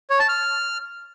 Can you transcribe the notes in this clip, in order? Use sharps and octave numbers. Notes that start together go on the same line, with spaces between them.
C#5
A5
F6